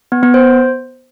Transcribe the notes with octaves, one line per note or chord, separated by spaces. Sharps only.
B3
B3
C5